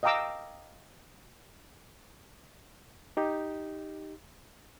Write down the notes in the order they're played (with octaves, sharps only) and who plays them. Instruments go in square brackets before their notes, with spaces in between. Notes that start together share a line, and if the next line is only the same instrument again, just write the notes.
[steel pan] D#5 F5 G5 A#5 D6 E6
[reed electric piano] D#4 G4